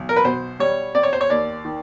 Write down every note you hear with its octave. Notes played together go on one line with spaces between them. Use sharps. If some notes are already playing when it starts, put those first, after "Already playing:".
Already playing: B1
A#4
B4
B2 C5
G3 C#5
C4 D5
C#5
C5
C#5
D#2 D5
D#3